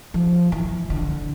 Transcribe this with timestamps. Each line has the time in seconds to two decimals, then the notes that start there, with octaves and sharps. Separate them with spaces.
0.14 F3
0.52 E3
0.90 D3